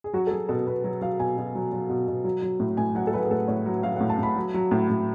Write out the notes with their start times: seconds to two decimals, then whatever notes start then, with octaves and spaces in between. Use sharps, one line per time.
0.04 G#4
0.13 F#3 F#4
0.27 A4
0.31 F#3 G#4
0.49 B2 A4
0.67 B2 B4
0.84 F#3
1.01 F#3 F5
1.20 B2 G#5
1.38 B2
1.55 F#3
1.73 F#3
1.89 B2
2.08 B2
2.24 F#3
2.42 F#3
2.60 A2
2.77 A2 G#5
2.95 F#3 F#5
3.07 A4
3.13 F#3 B4
3.23 G#4
3.31 A2 A4
3.48 A2 C#5
3.66 F#3
3.83 F#3 F5
3.96 F#5
4.00 A2
4.09 A5
4.18 A2 B5
4.36 F#3
4.54 F#3
4.71 A2
4.89 A2